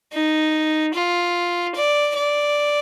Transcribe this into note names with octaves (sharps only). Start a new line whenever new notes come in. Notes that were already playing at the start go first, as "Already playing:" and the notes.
D#4
F4
D5
D5